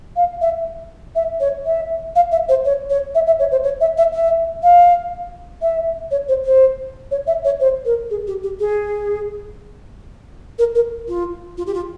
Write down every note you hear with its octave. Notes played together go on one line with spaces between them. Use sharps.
F5
E5
E5
C#5
E5
F5
E5
C5
C#5
C#5
E5
E5
C#5
C5
C#5
E5
E5
E5
F5
E5
C#5
C5
C5
C#5
E5
C#5
C5
A#4
G#4
G4
G4
G#4
A#4
A#4
F4
F4
G4
F4